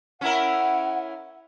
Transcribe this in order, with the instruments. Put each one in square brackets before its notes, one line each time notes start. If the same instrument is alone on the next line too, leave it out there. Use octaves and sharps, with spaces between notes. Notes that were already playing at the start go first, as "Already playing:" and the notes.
[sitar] C#4 E4 A#4 [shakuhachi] F#5